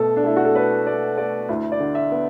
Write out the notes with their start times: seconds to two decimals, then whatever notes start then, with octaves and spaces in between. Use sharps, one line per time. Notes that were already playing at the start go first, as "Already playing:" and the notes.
Already playing: B2 A3 A4
0.16 D4
0.24 A3 E4
0.36 F#4
0.45 A4
0.55 A3 B4
0.86 A3 D5
1.17 A3 D5
1.49 D2 E4
1.72 D5
1.80 D3
1.95 E5
2.12 B3